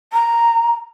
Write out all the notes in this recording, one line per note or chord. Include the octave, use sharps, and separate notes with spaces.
A#5